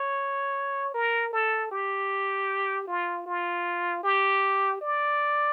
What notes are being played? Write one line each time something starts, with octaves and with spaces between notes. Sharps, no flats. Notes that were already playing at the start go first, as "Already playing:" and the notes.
Already playing: C#5
A#4
A4
G4
F4
F4
G4
D5